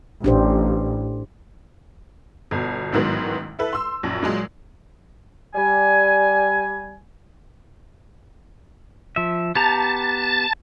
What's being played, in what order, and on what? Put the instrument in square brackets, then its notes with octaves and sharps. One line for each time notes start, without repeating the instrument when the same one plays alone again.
[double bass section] A1 [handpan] D4 G4 C5
[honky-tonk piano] G1 B2
A1 E2 G#2 D#3 F#3 B3
E4 A4 B4
C6 E6
A#1 F#2
A#2 F#3 G#3
[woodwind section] G3 G#5
[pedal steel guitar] F3 E5
[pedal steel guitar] B3 G4 A#5 [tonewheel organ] A5